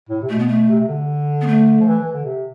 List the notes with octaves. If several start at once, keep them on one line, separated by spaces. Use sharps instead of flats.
A2
C3
B2 A3
B3
A3
C3
C3
D3
B3
A3
F3
E3
E3
D3
C3